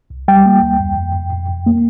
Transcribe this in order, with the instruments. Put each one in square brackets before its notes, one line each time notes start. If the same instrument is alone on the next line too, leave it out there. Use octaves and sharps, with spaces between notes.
[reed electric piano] C2
G3 G5
A#3
D2
F2
F2
F2
F2
F2
A#3